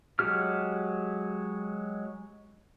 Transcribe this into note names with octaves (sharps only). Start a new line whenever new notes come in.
F#3 G#3 F#4 G4 F6